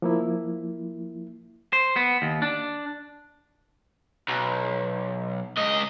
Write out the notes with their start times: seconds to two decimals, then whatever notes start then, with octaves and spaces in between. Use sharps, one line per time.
0.02 F3 A#3 E4
1.73 C5
1.96 B3
2.22 D#2
2.42 D4
4.28 B1
5.57 C#2 D#5